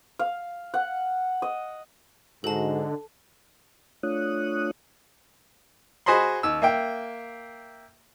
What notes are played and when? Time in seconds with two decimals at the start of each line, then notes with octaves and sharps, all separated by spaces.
0.19 F5
0.74 F#5
1.42 D#5
2.44 G#2 D3 G#3 D#4 F#4 A4 A5
4.03 A3 D4 F4 C#5 D#6 F#6
6.06 F#4 G#4 C5 D#5 B5 C6
6.43 D#2 E6
6.62 A#3 E5 G5